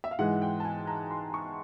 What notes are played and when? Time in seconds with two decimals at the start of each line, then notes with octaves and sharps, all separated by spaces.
0.04 E5
0.11 F5
0.19 G#2 E3 G#3 F#5
0.42 G5
0.60 A5
0.65 G#5
0.87 A#5
1.11 C6
1.34 C#6